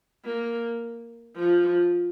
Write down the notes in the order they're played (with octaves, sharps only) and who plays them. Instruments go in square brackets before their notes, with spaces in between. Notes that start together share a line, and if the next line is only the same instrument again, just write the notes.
[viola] A#3
F3